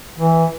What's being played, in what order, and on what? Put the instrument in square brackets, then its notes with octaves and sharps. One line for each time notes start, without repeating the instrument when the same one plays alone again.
[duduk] E3